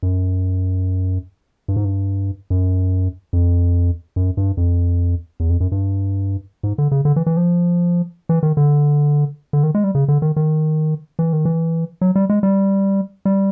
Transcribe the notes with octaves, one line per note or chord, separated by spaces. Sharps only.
F#2
G2
G#2
G2
F#2
F2
F#2
G2
F2
E2
F2
F#2
G2
G#2
D3
C#3
D3
E3
E3
F3
E3
D#3
D3
D3
D#3
G#3
G3
C#3
D3
D#3
D#3
E3
D#3
E3
F#3
G3
G#3
G3
G3